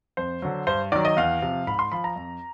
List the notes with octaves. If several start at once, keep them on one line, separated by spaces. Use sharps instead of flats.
F2 C5
D3 F#3
G2 C5
D#3 F#3 D5
D#5
E2 F5
C3 F3
G#2 B5
C6
F3 B5
A#5
F2